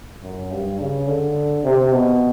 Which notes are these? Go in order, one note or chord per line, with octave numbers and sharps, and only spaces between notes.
F#2
G2
C#3
D3
C3
B2